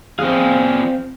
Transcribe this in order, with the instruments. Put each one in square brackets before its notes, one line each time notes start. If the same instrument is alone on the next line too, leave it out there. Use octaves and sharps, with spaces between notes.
[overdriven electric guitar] F3 G#4 [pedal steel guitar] C4 F5